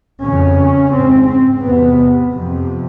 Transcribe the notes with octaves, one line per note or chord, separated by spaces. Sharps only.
F2 C#3 C#4
G#2 C4
C4
E2 C3 B3
F2 C3